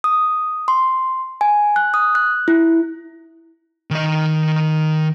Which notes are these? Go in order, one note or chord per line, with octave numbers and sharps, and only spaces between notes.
D#6
C6
G#5
F#6
D#6
F#6
E4
D#3 D#5